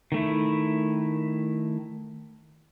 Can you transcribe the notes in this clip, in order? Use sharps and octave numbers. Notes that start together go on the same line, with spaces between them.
D#3 A3 E4